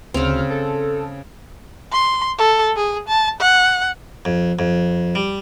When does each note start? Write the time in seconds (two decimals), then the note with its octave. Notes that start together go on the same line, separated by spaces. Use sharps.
0.14 D2 C#3 C4 F6
0.50 A4
1.92 C6
2.38 A4
2.76 G#4
3.08 A5
3.40 F#5
4.25 F2
4.59 F2
5.15 G3